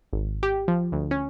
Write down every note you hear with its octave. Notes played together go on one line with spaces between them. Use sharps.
G#1
G4
F3
D2
C#4